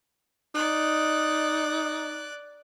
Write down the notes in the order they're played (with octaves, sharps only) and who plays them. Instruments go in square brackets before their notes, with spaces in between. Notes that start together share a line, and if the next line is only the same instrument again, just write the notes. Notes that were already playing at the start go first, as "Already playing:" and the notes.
[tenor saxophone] D#4 [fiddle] D5 F#6